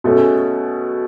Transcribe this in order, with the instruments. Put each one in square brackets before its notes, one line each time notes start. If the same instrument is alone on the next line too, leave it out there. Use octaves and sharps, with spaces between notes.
[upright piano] B2 A3 C#4 G#4